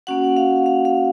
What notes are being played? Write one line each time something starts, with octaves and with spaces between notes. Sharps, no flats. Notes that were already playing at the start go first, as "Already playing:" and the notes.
A#3 C#4 F#4 F#5
F5
F5
F5